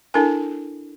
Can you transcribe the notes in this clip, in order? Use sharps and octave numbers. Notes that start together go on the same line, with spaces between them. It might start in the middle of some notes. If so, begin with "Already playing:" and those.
D4 E4 A4 A#4 G#5